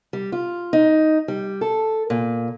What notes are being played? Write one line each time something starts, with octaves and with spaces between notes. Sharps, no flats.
G3
F4
D#4
G3
A4
A#2